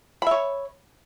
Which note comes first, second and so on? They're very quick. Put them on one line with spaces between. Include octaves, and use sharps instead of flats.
B5 E5 C#5